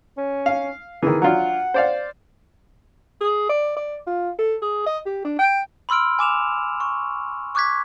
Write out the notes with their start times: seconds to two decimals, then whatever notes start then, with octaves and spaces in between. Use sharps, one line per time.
0.18 C#4
0.46 F5
1.03 D#3 E3 G#4
1.22 F#3 D4 F4 F#5
1.74 C5 D5 F5
3.21 G#4
3.50 D5
3.76 D5
4.07 F4
4.39 A4
4.62 G#4
4.86 D#5
5.06 G4
5.25 D4
5.39 G5
5.89 B5 C6 E6 F6 D7
6.19 G#5 D6 E7 F7
6.80 C#6
7.55 C#6 D6 F#6 G#6 B6